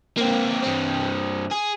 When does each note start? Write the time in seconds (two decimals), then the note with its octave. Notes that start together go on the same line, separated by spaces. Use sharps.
0.18 A#3 C4
0.63 G2 C4
1.51 G#4